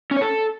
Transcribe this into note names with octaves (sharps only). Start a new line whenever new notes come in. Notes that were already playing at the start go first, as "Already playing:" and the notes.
C#4
C#5
A4